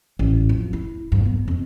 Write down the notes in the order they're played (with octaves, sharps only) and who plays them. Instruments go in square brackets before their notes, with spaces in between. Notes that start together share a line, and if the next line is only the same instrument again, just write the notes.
[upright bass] A1
F2
E4
G2
B3
F2